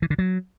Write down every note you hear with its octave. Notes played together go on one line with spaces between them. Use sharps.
E3
D3
F#3